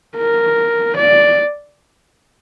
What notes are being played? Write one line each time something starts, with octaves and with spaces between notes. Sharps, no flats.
A#4
D5